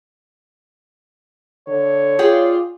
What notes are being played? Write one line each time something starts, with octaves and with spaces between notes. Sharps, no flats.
D3 C#5
F4 G#4 D5 G5